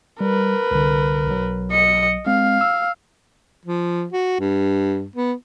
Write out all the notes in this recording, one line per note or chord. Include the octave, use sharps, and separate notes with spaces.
G3 A#4 B4
C2 D3
B1 F#3
D#5 C#7
G#3 C4 F5
E6
F3
F#4
G2
B3